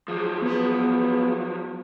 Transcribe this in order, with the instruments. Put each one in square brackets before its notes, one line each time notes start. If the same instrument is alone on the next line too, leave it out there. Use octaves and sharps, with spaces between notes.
[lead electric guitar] F3 F#3 [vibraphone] G#4
[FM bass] B3